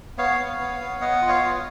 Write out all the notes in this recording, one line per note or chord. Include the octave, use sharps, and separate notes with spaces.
B3 C#5 F5
B3
B3
B3
B3 D#5 F#5
F4
C#5 F5
F4